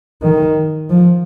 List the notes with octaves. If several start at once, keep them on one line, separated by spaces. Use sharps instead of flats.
D#3
F3